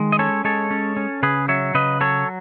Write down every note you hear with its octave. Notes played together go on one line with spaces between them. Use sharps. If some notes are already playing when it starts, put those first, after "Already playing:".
Already playing: D#3 G#3
D#5
C#4 A4 C#5
G#3 A4 C#5
C#4
C#4
C#3 G#4 B4
F#3 C#5 E5
C#3 B4 D#5
F#3 A4 C#5